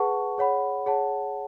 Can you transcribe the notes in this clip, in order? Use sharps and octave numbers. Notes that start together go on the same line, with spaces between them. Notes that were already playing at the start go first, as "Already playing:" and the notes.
Already playing: G#4 B4 F#5 A5 C#6
G#4 C#5 F#5 B5
G#4 C#5 F#5 A5